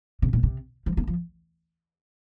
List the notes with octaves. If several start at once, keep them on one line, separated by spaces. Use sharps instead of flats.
C3
A#2
C3
F3
A#3
F3